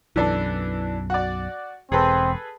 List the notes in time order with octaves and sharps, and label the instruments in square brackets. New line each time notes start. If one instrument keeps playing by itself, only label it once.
[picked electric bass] B1 F#2 [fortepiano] E3 D4 A4
[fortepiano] F#4 D5
[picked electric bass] E1 [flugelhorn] C4 [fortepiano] G#4 A4 B4